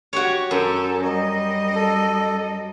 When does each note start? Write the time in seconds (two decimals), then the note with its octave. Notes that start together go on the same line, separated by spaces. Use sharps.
0.13 F#4 G4 C#5
0.51 F#2 A4
1.02 G3 D#5
1.75 A4